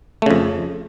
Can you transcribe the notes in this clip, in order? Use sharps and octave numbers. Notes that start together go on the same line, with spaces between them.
F2 C#3 A3